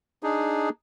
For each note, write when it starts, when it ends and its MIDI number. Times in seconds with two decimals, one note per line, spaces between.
0.23 0.69 62
0.23 0.69 63
0.23 0.69 68